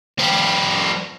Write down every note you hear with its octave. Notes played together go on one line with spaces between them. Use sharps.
F3 G3